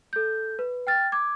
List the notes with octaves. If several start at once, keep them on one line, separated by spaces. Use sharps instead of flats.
A4 G6
B4
G5 F6 A6
D6 G#6